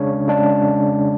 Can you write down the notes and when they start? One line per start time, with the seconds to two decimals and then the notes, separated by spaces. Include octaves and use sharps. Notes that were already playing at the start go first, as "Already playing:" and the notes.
Already playing: C#3 G#3 D4 C#5
0.28 C#3 G#3 D4